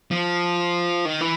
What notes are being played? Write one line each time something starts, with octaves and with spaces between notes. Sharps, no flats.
F3
D#3
E3